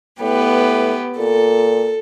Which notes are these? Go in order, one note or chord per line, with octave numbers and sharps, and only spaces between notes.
A2 B3 G4 B4
A#2 A4